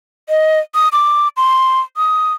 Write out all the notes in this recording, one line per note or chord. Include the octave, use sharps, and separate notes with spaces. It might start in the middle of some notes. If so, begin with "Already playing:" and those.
D#5
D#6
D6
C6
D#6